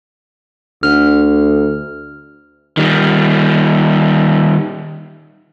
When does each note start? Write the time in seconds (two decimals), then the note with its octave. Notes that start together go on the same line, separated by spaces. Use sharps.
0.83 D2 D3 F6
2.77 D#3 G3